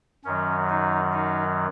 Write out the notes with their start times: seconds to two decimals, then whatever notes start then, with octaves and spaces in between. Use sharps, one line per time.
0.24 F#2 D#3 F#3 C#4
0.69 D#4
1.13 D#4